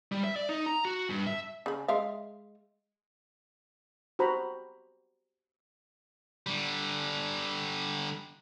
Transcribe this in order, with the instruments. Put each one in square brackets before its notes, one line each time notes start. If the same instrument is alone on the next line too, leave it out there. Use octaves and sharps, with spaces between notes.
[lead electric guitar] G3
E5
D5
D#4
A#5
F#4
G2
E5
[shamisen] C#3 B5
G#3 E5 F5
[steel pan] F#4 G4 C5 A#5 B5
[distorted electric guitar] D3 G3